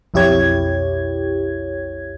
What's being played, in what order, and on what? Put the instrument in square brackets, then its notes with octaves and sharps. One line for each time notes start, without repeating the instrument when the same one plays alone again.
[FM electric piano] B1 F2 E4 G4 C#5 G#6